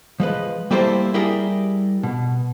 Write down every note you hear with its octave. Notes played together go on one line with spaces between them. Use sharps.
F3 G#3 B4
G3 A#3 E4 G4 A4 C5
G3 E4 G4 G#4 A#4
B2